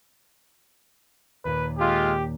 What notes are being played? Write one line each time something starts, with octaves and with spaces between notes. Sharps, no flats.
D#2 A#2 B4
G#3 F4 G4